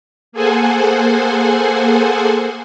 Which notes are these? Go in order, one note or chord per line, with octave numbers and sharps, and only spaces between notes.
A#3 G#4 A4 C5 F#5 G#5